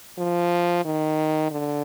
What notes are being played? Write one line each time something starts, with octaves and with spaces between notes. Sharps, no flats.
F3
D#3
D3